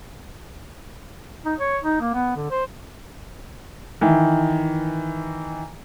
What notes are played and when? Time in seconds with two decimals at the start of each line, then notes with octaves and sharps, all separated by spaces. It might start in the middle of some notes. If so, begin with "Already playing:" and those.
1.46 D#4
1.59 C#5
1.84 D#4
2.01 A#3
2.14 B3
2.36 D3
2.51 C5
4.01 D#3 E3